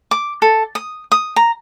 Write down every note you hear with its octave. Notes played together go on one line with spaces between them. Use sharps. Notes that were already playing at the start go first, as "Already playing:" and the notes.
D6
A4
D#6
D#6
A#5